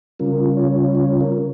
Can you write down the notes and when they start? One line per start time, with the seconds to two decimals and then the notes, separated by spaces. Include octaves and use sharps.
0.19 C#3 G3 C#4 F4 A#4
0.57 C#5
0.95 C#5
1.21 A#4